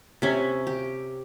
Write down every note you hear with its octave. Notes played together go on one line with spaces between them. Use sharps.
C3 C#4 E5
G4